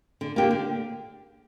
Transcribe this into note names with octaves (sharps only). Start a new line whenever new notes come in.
D3
A#3 D4 G4
D3